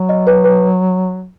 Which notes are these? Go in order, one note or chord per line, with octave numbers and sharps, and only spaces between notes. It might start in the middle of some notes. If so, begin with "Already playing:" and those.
Already playing: F#3
D#5
B4
B4